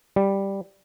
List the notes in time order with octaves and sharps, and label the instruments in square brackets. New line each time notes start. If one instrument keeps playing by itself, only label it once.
[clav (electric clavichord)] G3